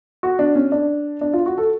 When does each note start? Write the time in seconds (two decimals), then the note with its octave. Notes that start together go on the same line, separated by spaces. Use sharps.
0.23 F#4
0.39 D4
0.55 C#4
0.72 D4
1.21 D4
1.33 F4
1.46 F#4
1.58 A4